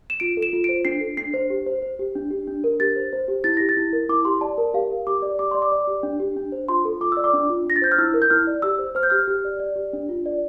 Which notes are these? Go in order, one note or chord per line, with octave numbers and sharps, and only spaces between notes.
E7
F4 D7
A4
E7
F4
D7
C5
D4 C7
A4
D4 C7
C5
G4
C5
C5
G4
D4
G4
D4
A#4
G4 A6
C5
C5
G4
E4 A6
G4 A#6
A6
E4
A#4
E4 D6
G4 C6
D5 A5
A#4
G4 F5
A#4
G4 D6
D5
G4 D6
D5 C6
D6
D5
G4
D4
G4
D4
C5
F4 C6
A4
F4 D6
D5 E6
D6
D4
F4
D4 A#6
A6
C5 G6
F6
E4 E6
A#4
G6
E4 F6
D5
G4 E6
C5
C5 F6
G6
G4 F6
G4
D5
D5
G4
D4
F4
D5